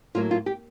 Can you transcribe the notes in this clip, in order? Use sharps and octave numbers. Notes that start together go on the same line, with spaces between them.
A2 F#3 A#3 F4
F4
G4